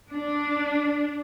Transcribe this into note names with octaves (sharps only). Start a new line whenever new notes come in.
D4